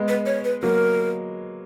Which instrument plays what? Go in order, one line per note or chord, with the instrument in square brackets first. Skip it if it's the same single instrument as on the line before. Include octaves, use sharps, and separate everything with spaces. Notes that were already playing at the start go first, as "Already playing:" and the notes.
Already playing: [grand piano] G#3 B3
[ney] B4
C#5
B4
[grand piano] F#3 A#3 [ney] A#4